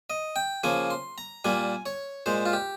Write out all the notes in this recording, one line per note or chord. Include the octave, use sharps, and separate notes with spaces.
D#5
G5
C#3 F3 A#3 G#5
C6
A#5
A#2 G3 A#3 G#5
C#5
A#2 G#3 C5
F4
G4